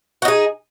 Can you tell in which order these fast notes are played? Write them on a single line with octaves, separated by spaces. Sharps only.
F#4 D#4 G#4